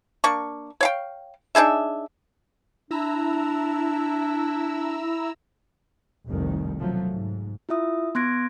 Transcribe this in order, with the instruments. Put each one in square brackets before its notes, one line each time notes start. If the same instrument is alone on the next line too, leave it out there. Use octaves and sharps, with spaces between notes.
[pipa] A#3 D4 C#6
C#5 F5 G5
D4 D#4 G#4 E5
[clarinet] D4 [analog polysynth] E4 A#5 E6
[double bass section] F1 C2 F2 D#3
B2 F3 F#3 A3
G#2
[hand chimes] E4 F4 E5 D#6
B3 C6 F#6 G#6 A#6 D7